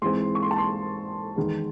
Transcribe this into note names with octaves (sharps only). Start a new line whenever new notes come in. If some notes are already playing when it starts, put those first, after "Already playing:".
G#2 E3 G#3 C4 C6
C#6
C6
A5
C6
E2 D#3 G#3